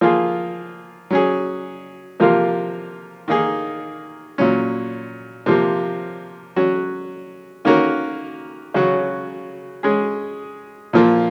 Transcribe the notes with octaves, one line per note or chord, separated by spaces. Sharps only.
F3 A#3 F4 G#4
F#3 C#4 G#4
C3 F3 A#3 F4 A#4
D#3 A#3 D#4 G#4
A#2 F#3 C#4
C3 F3 A#3
F#3 C#4 F#4
D#3 A#3 C#4 F#4 A#4
C#3 F#3 C#4 F#4
G#3 C#4 G#4
A#2 F3 A#3